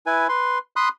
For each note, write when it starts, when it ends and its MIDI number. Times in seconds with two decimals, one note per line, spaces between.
0.06 0.27 64
0.06 0.27 71
0.06 0.27 80
0.29 0.58 71
0.29 0.58 84
0.76 0.89 83
0.76 0.89 84
0.76 0.89 87
0.76 0.89 90